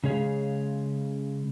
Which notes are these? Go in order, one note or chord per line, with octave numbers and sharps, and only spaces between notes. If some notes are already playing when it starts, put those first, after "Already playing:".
C#3 G#3 G#4 C#5 F5